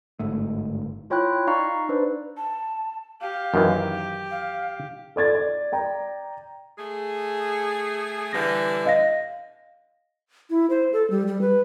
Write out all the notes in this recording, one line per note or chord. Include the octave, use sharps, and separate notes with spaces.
G1 G#2 A3
E4 F4 C#5 G5 B5 F#6
D#4 D5 F5 A#5 C#6
D4 B4 C5 D5
A5
G4 F5
F#2 D#3 E3
F5
A4 D5 G#6 A6
D5
D5 G5 A#5
A3 G#4
D3 E3 G3 A#6
D#5 F5 A#6
E4
C5
A4
G3
G3
B4